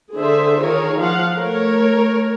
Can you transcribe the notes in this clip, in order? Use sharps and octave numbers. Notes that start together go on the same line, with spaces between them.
D3 G#4 A4 C5 E5
D#3 F4 G#4 A#4 C#5
F3 F4 F5 F#5
A3 A#4 C#5